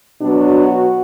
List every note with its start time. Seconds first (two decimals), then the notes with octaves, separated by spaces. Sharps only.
0.21 B2 F#3 B3 D4
0.68 F#4